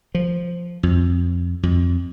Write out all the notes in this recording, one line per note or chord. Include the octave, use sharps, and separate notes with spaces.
F3
F2
F2